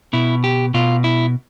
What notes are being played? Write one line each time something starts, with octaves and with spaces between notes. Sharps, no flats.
B2 E4
G4
B2 F4
E4